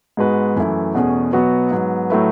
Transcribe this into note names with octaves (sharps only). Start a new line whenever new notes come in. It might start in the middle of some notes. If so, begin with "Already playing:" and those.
G#2 G#3 B3 F#4 B4
F#2 E3 A3 E4
E2 B2 A3 C#4 G#4
B2 F#3 B3 F#4
G#2 F#3 B3
A2 F#3 A3 E4 B4